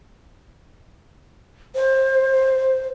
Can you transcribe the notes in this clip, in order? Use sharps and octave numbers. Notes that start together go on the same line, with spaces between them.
C5